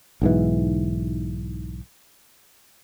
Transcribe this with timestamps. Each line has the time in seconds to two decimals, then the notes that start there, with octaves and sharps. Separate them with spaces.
0.22 B1 G#2 E3